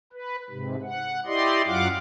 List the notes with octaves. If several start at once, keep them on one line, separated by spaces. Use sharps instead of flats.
B4
G#2 C3
F#5
E4 G4 D5 D#5 C6
F#2 F#3 F4 F5 F#5 D6